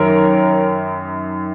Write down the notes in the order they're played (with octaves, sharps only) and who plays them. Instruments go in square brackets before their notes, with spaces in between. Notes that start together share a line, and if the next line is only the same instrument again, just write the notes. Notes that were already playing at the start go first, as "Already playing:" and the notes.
Already playing: [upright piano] F#2 D#3 A#4 C#5